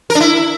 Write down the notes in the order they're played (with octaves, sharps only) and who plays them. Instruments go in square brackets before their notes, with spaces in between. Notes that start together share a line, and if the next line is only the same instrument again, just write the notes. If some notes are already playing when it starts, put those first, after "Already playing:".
[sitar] A#4
D4
E4